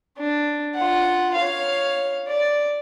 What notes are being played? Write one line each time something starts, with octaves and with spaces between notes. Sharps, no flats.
D4
F4 F#5
C#5 F5
D5